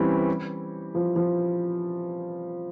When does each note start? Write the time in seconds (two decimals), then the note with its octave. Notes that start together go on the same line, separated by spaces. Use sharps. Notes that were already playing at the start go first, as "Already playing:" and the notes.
Already playing: E3 G3 C4 C#4 E4
0.95 F3
1.16 F3